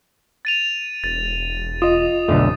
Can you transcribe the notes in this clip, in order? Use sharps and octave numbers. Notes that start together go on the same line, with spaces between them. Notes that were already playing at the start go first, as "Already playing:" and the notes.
A6 D#7 F7
E1 A6
F4 D#5 D#6
B1 F2 D3 A3